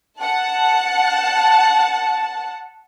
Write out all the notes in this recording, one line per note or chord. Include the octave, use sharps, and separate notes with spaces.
F#5 A5